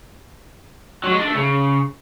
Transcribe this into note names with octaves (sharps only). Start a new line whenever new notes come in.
F#3
G#3
D4
A3
C#3